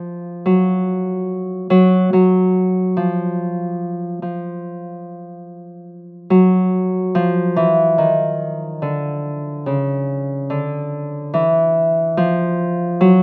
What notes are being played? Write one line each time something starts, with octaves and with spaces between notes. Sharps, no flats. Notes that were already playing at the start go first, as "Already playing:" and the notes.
Already playing: F3
F#3
F#3
F#3
F3
F3
F#3
F3
E3
D#3
D3
C#3
D3
E3
F3
F#3